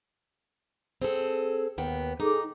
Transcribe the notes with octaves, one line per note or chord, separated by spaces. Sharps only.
C4 G#4 A4
D#2 B3 G5
D#4 G#4 A4 D6